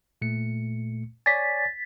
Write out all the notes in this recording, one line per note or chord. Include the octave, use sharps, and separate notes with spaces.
A#2 A3 C#7
C#5 D5 G#5 A6 B6